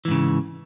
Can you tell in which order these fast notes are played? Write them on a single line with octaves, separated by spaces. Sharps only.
E3 G#2 C#3